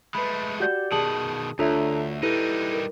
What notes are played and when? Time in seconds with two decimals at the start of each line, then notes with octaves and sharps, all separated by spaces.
0.14 G#3 A3 B4 B5
0.60 F#4 G4 D5 F#5 G6
0.92 B2 D#3 G#4 A5 D#6 F#7
1.59 D2 D4 F4 A4 C#5 E5 A#5
2.23 G3 D#4 E4 G4 A4 B4 D#7
2.73 A#4